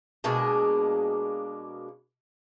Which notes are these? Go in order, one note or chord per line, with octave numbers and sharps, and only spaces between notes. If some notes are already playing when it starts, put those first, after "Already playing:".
B2 G#3 A#3 D4